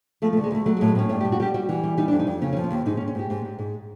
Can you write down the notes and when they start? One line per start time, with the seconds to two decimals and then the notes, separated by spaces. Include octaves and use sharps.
0.22 F3 A3
0.33 A3
0.37 D2
0.44 G#3
0.51 D2 A3
0.66 F#3 A3
0.77 G#3
0.81 A2
0.88 G#3
0.95 A2 C#4
1.09 G2 C#4
1.20 G4
1.25 G3
1.32 F#4
1.40 G3 G4
1.54 G3 F#4
1.69 E3
1.84 G3
1.97 G3 D#4
2.08 F2 D4
2.19 D#4
2.27 F2
2.42 C#3 C#4
2.53 C#4
2.57 F3
2.64 C#4
2.71 D#2
2.86 G#2 D#4
2.97 C#4
3.01 G#2
3.08 C#4
3.15 G#2 G4
3.30 G#2
3.45 G#2
3.59 G#2